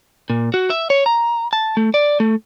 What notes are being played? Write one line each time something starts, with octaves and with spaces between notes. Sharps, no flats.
A#2
F#4
E5
C#5
A#5
A5
A3
D5
A3